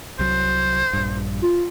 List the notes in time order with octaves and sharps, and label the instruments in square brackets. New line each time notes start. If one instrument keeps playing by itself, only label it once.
[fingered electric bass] C2 F#3 [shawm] C5
[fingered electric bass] A#1 G2
[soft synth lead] F4